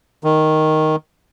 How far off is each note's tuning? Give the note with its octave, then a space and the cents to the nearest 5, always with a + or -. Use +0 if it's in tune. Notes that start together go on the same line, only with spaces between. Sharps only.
D#3 +0